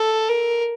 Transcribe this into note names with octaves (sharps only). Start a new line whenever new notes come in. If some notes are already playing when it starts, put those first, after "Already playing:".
Already playing: A4
A#4